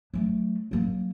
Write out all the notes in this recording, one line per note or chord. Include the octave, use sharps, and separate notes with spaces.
F#3 A3
F#3 A#3